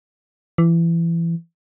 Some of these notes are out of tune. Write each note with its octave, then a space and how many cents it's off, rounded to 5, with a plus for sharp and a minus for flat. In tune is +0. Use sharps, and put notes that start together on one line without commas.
E3 +25